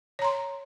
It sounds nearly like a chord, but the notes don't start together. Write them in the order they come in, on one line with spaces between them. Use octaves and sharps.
C#5 A#5 C6